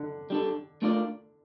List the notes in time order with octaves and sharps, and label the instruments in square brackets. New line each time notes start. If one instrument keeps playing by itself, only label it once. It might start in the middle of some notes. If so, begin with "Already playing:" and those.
Already playing: [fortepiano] D3
[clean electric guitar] G3 D4 A4
A3 D4 F4 A#4 D5